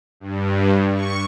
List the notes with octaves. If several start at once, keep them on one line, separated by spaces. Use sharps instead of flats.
G2
C#6